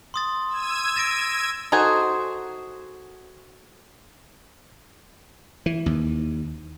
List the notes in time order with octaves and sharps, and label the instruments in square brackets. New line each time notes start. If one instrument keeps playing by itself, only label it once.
[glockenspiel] C6 D#6 A6
[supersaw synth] E6 G#6 D#7
[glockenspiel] A6 A#6 D7
[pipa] D#4 G#4 [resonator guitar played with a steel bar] F#4 A4 C5
[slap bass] E3
D#2